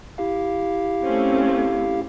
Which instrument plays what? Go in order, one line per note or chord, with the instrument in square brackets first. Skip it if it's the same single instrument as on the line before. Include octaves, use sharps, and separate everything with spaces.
[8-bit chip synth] E4 G4 F5
[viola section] A3 C4 C#4